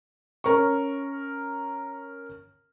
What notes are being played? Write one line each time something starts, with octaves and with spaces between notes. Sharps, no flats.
C#4 A#4 C#6